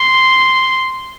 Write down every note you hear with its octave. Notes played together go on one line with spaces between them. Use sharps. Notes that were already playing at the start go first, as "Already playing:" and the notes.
Already playing: C6